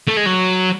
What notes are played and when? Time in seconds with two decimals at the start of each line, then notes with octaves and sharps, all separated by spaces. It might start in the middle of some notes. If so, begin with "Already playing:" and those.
0.07 A3
0.16 G#3
0.26 F#3